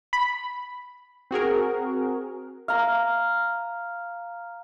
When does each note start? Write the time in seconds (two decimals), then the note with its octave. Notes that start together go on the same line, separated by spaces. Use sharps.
0.13 B5
1.31 C4 F#4 G#4 A#4
2.68 F5 A#5